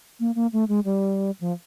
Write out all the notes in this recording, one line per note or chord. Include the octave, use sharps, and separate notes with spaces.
A#3
A#3
A3
G#3
G3
F3